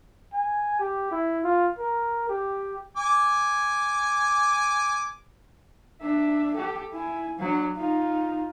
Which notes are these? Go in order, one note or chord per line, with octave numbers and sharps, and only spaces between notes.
G#5
G4
E4
F4
A#4
G4
G#5 D6
D4 E5
G4 A4
E4 G#5
F#3 D4
D#4 F4